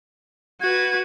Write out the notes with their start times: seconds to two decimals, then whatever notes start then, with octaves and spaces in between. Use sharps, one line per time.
0.61 F#4 B4 G#6